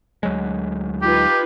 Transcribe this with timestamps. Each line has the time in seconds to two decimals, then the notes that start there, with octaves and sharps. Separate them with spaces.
0.23 D2 F#3 G#3
1.02 D#4 F4 G4 B4